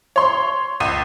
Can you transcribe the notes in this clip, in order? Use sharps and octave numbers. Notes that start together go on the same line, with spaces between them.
C#5 C6
C#2 D#7